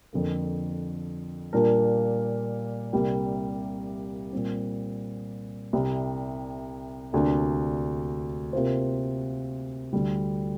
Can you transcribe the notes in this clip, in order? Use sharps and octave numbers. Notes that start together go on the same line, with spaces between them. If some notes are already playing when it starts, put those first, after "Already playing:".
F2 D3 A#3
A#2 G3 D4 F4 A#4
C2 C3 G3 A#3 G4
A#2 G3 C4
C2 C3 G3
D2 C3 A#3 D4
C3 A#3 F4 C5
D2 D3 G3